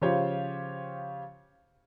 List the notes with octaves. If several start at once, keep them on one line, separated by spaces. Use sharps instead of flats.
C#3 F3 F4 G4 C5 C#5